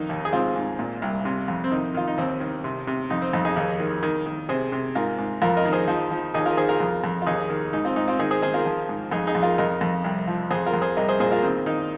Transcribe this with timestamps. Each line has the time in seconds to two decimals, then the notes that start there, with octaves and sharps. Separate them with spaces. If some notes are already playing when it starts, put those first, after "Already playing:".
Already playing: F2 D#3 D#4
0.09 D#2
0.25 G#4
0.32 G#2 C4 F4
0.56 G#2
0.79 A#2
1.02 C2
1.25 C3
1.48 F2
1.64 C4
1.71 D#3 D#4
1.94 D#3 F4
2.08 D#4
2.18 D#2 C4
2.40 D#3
2.64 C3
2.87 C3
3.10 F2 D#4
3.22 C4
3.33 F2 D#4
3.45 D#4 G#4
3.56 D#2 D#4 G#4
3.80 D#3
4.03 D#3
4.26 D#3
4.49 C3 G#4 C5
4.72 C3
4.95 G#2 F4 A#4
5.18 G#2
5.42 F2 F4 A#4
5.57 A#4 D#5
5.65 D#3
5.73 G#4 C5
5.88 F3 D#4
6.11 F3
6.34 D#2 D#4 G#4
6.46 F4 A#4
6.57 D#3 G#4 C5
6.69 F4 A#4
6.80 F2
7.04 F2
7.22 F4
7.26 D#2 D#4 G#4
7.50 D#3
7.73 G#2 D#4
7.85 C4 F4
7.96 G#2 D#4
8.08 C4 F4
8.19 D#3 D#4 G#4
8.31 G#4 C5
8.42 D#3 G#4 C5
8.54 F4 A#4
8.66 F3
8.89 G#2
9.11 F2 D#4 G#4
9.27 D#4 G#4
9.35 F2
9.42 F4 A#4
9.58 F2 A#4 D#5
9.81 F2
10.04 C2
10.27 F3
10.51 F2 G#4 C5
10.66 F4 A#4
10.74 F2
10.82 G#4 C5
10.97 C2 A#4 D#5
11.08 G#4 C5
11.20 A#2 G#4 C5
11.32 F4 A#4
11.43 D#3 C4
11.66 D#3 D#4